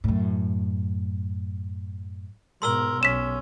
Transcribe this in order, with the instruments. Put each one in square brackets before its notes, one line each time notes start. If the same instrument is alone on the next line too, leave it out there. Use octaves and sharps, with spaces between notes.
[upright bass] F#2 A2
[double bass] G#2 B2 [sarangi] A#4 [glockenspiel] C6 E6 G7
[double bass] B1 [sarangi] C#4 [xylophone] B6 E7